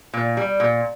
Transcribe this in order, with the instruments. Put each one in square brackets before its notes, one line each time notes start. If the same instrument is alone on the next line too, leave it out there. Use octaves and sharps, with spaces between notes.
[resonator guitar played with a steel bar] A#2
G3
A#2